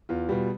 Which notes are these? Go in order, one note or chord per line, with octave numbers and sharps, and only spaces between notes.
E2 F4
B2 G3